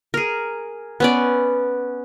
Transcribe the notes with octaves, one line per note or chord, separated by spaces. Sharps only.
G#4 A#4
B3 C#4 D5